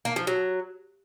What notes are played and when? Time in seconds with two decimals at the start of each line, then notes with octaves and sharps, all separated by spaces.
0.05 A#3
0.16 F3
0.27 F#3